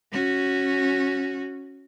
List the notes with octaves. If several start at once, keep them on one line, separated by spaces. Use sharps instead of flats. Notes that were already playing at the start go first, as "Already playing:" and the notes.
C#4 F#4